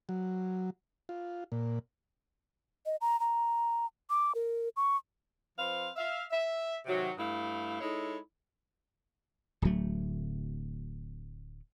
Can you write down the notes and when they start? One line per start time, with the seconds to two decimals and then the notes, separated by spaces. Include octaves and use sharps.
0.09 F#3
1.09 F4
1.52 A#2
2.86 D#5
3.01 A#5
3.20 A#5
4.10 D6
4.35 A#4
4.77 C#6
5.57 F3 C4 B4 C5 F5
5.96 E5 F5
6.31 E5
6.86 C3 D#3 F#3
7.17 G2 A3 E4 F5
7.81 G#3 D#4 E4 A4 C#5
9.62 D1 D2 F#3 A3